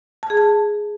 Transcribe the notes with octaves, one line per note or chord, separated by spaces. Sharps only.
A5
G#4
A5